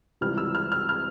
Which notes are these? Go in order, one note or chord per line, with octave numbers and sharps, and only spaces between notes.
C#2 C3 E3 G3 F6
E6
F6
F6
F6